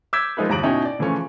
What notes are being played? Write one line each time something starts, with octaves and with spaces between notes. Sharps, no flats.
D6 E6 G6 G#6 B6
F3 G#3 D#4 A#4 B4
G1 E2 G2 A#5 D7 F#7
B2 C#4 D#4 E4 G5
D5
C#3 E3 F3 A3 C#4